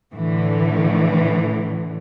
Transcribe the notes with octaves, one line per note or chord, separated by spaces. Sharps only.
A2 D3 E3